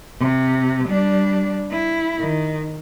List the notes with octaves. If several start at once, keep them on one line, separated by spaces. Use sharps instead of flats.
C3
G3 D4
E4
D#3